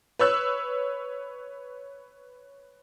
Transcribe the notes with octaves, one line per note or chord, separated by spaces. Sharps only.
B4 C#5 E6 F#6